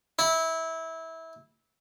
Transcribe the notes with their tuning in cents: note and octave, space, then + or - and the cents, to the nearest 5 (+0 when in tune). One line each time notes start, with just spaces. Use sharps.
E4 -20